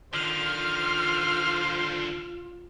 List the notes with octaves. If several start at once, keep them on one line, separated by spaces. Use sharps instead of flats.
D3 D#3 F4 C5 F6